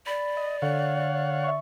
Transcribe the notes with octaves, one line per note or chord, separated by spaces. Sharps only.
D5 B5
D#5
D3 C#5 F5 F#5
E5 C#6